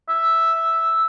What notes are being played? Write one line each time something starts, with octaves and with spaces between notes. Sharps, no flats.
E5